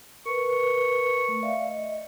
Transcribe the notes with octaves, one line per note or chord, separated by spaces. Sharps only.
A#4 B4 C#6
A3
D5 E5 F5
D#5